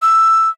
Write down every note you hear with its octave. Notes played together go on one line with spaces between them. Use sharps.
E6